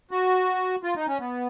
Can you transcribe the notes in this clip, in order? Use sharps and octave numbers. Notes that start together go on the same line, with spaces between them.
F#4
F4
D#4
C#4
B3